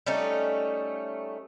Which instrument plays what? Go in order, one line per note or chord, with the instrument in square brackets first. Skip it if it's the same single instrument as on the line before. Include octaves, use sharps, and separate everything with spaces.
[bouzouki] G3 A3 C#4 D#4